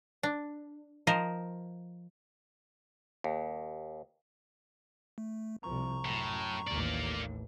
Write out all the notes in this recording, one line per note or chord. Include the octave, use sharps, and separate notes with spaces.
D4
F3 A#4 C5 D#5
D#2
A3
C2 F3 A#5 C#6
F#2 A2
A1 D#2 A#3 D5